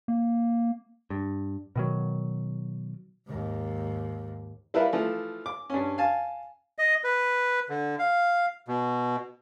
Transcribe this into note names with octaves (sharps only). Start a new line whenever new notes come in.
A#3
G2
B2 D#3 F#3
D#2 G#2
G3 E4 A#4 B4 E5 F5
E3 F3 A3
D6
G2 C#4
F5 G#5 A5
D#5
B4
D3
F5
B2